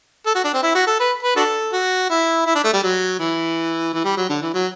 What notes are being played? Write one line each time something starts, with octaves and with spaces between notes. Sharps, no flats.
A4
F#4
D4
C4
E4
F#4
A4
B4
B4
D4 F#4 A4
F#4
E4
E4
D4
A3
G3
F#3
E3
E3
G3
F#3
D3
E3
F#3